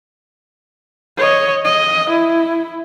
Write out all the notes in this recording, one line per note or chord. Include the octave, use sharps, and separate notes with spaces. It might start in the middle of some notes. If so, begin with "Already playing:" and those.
C#5 D#5
D#5
E4